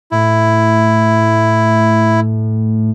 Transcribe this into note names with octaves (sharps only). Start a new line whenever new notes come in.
A2 E4